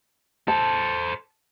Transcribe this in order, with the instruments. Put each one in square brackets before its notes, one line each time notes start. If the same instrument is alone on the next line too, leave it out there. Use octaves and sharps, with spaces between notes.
[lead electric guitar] A4 C5 [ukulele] A5